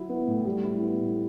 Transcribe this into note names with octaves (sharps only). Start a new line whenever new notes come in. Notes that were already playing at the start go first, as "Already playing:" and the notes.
Already playing: F#3 E4
B3
A2
G3
E4
B3
A2